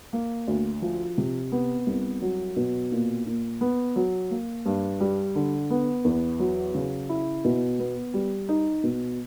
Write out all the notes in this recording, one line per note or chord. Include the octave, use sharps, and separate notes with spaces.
A#3
D2
F3
C3
B3
C2
F#3
B2
A#2
A#2
B3
F#3
A#3
G2
G3
D3
B3
E2
F#3
C#3
E4
B2
B3
G3
D#4
B2